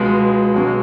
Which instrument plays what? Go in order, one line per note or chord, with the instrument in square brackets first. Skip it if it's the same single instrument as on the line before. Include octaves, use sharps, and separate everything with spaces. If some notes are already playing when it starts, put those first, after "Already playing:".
Already playing: [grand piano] C#2 B2 G#3
B1 B2 G#3